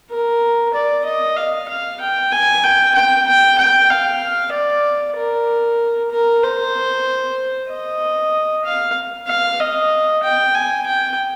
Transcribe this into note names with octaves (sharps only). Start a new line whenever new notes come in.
A#4
D5
D#5
F5
F5
G5
G#5
G5
G5
G5
G5
F5
D5
A#4
A#4
C5
D#5
F5
F5
D#5
G5
G#5
G5